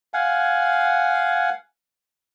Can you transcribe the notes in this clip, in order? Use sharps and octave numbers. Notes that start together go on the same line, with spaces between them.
F5 F#5 G#5